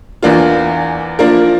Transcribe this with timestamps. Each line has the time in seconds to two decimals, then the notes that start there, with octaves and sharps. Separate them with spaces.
0.23 E2 E3 A#3 D4 F4
1.19 F3 A#3 D4 F4 A#4